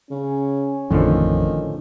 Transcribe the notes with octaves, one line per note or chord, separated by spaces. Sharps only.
C#3 C#4
A1 F2 A2 D3 D#3 F3